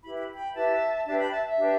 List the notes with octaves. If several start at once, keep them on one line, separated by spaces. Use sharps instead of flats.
E4 G4 B4 B5
B5
G5 B5
E4 G4 B4 E5 A5
D4 G4 B4 E5 A5
G5 B5
E5 A5
E5
D4 G4 B4